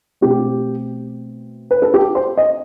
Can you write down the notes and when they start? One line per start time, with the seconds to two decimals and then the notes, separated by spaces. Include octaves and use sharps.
0.21 B2 A3 C4 G4
1.71 B4
1.82 A4
1.94 G4
2.15 C5
2.37 D#5